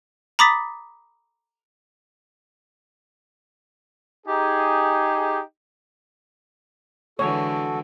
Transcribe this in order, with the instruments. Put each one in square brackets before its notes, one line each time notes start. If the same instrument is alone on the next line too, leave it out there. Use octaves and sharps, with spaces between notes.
[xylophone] A#5 B5 D6 D#6 A6 B6
[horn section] D#4 G4 G#4
[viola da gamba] D3 E3 G#3 [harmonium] F#4 A4 [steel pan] C#5